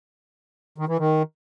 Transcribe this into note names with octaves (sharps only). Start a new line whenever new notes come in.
D#3
E3
D#3